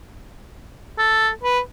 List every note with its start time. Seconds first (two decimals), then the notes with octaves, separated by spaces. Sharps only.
0.98 A4
1.44 B4